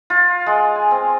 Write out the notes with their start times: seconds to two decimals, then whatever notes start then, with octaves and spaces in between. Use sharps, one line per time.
0.10 F4
0.46 G#3
0.75 G#5
0.91 C4